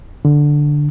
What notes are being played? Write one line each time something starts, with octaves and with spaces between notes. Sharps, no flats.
D3